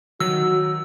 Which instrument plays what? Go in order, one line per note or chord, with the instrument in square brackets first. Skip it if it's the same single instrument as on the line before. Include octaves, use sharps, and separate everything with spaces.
[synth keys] D#3 [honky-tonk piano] F#3 [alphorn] F#4 [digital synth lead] E6